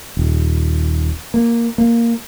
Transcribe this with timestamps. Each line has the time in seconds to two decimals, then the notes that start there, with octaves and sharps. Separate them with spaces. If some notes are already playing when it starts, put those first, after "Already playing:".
0.17 D#1
1.34 A#3
1.78 A#3